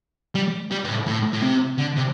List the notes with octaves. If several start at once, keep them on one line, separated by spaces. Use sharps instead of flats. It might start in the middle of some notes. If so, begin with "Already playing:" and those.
G3
G3
G2
A2
A2
A2
C3
D3
C3